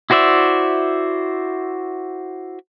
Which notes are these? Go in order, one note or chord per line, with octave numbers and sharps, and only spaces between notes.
E4 F#4 C5 D5 E5